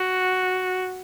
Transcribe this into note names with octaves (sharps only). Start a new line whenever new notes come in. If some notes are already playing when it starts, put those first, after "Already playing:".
Already playing: F#4